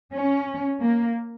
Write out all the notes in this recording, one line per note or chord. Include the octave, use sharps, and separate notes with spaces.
C#4
A#3